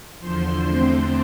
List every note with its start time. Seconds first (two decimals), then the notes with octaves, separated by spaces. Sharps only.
0.20 E2 D3 F3 C5 C6
0.66 E2 D3 A3 C4 C5 C6